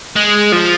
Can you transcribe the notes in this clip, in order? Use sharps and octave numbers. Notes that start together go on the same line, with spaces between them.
G#3
F3